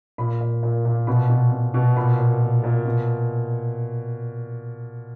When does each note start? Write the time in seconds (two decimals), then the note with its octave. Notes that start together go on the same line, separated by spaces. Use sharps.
0.18 A#2 B5
0.41 A#2
0.63 A#2
0.85 A#2
1.07 B2 B5
1.30 B2
1.52 B2
1.74 B2
1.96 A#2 B5
2.18 A#2
2.41 A#2
2.63 A#2
2.85 B2